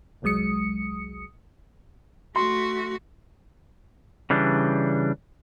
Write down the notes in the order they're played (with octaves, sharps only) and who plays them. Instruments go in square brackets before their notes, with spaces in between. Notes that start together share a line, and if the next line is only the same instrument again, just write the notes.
[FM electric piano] G1 C2 F#3 G#3 D#6 C#7
[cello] A3 F#4 [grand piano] C6
[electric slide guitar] C#3 E3 G3 D4